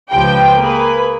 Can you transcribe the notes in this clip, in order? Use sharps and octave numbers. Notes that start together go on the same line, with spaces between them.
C#2 F3 G4 B4 G5
A#3 G#4 B4